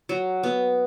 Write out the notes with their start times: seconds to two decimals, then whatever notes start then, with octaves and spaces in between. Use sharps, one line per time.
0.09 F#3
0.43 B3